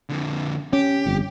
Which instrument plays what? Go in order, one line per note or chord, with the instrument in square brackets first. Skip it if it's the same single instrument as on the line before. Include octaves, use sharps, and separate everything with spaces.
[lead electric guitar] F2 D3
[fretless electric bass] C#4 [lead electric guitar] G4
[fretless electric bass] G1 F2